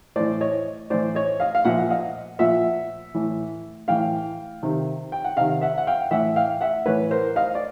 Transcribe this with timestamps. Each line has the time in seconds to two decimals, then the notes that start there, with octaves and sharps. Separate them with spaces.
0.16 A2 E3 C5 D5
0.41 C#5 D#5
0.90 A2 E3 C5 D5
1.15 C#5 D#5
1.40 D#5 F5
1.55 F5
1.65 A#2 F3 E5 F#5
1.78 F#5
1.90 D#5 F5
2.39 A#2 F3 E5 F#5
3.15 A2 E3
3.88 A2 E3 F5 G5
4.63 C3 D#3
5.12 G5
5.24 F#5
5.37 C3 D#3 D#5 F5
5.61 E5 F#5
5.78 F#5
5.87 F5 G5
6.11 A2 E3 E5 F#5
6.36 F5 G5
6.61 E5 F#5
6.85 A2 E3 B4 C#5
7.11 A#4 C5
7.36 D#5 F5
7.55 D5